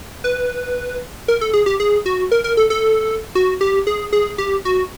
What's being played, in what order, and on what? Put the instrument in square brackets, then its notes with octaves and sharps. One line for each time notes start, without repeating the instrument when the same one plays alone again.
[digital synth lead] B4
A#4
A4
G#4
G4
G#4
F#4
A#4
A#4
A4
A4
F#4
G4
G#4
G#4
G4
F#4